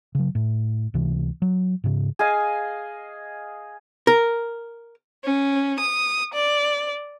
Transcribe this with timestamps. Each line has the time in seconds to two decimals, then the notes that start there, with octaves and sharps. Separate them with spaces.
0.15 C#3 F#3
0.35 A2
0.94 C#2 C3 E3
1.42 F#3
1.84 G#2 C#3
2.19 G#4 D#5 F5 G#5
4.07 A#4
5.24 C#4
5.80 D#6
6.34 D5